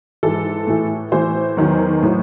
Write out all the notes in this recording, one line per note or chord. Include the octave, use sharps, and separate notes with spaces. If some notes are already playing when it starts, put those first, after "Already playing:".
G#2 E3 A4
A2 E3
A2 E3 C5
E2 D#3 F#3
A2 F#3